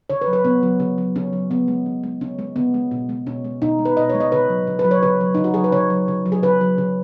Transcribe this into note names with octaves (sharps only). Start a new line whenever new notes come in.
C#3 C#5
B4
F#3
B4
C#3 B3
F#3
C#3
F#3
C#3 C#4
F#3
C#3 B3
G#3
C#3
G#3
C#3 C#4
G#3
C#3 B3
G#3
B2
G#3
B2 C#4
G#3
B2 D#4
G#3
B4
B2 D#5
G#3 C#5
D#5
C#3 B4
F#3
C#3
B4
F#3
C#5
C#3 B4
F#3
C#3 D#4
F#4
F#3 G#4
B4
C#3 C#5
F#3
C#3
F#3
G#4
C#3 B4
F#3
C#3